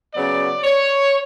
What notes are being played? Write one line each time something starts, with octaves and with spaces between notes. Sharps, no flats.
C#3 F#3 B3 D5
C#5